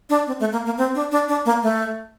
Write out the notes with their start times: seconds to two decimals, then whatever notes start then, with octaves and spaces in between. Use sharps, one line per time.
0.10 D4
0.27 C4
0.40 A3
0.52 A#3
0.65 A#3
0.78 C4
0.95 D4
1.12 D4
1.28 D4
1.45 A#3
1.63 A3